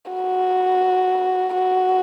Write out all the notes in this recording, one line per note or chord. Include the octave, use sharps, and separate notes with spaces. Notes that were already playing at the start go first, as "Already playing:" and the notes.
F#4
F#4